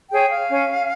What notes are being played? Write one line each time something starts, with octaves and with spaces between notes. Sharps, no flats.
G#4 C#5 G5
F5
C#4